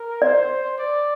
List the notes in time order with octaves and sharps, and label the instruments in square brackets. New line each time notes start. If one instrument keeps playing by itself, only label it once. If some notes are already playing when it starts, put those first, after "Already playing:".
Already playing: [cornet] A#4
[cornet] C5 [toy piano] D5
[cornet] D5